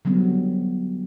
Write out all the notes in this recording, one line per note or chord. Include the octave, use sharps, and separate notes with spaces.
D3 F#3 G3 B3 C4